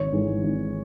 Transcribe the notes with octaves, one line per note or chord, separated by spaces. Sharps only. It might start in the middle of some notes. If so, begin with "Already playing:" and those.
Already playing: G#1 C#5
G#2 E3 G#3
G#1